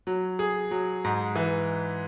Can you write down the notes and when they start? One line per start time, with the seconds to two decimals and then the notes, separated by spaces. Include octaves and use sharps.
0.07 F#3
0.39 G#4
0.71 F#3
1.04 G#2
1.35 E3